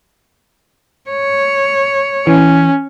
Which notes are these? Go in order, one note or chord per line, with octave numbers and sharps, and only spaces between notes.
C#5
E3 C#4